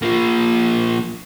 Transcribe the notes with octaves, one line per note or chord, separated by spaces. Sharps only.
F3 A#3